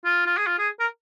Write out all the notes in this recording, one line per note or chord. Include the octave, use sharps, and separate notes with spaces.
F4
F4
G#4
F4
G#4
A#4